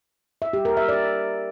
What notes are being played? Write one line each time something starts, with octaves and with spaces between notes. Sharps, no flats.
E5
G4
A#4
E5
D5